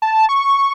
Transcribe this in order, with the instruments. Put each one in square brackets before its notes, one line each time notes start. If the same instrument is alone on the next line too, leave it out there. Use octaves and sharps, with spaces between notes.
[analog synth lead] A5
C#6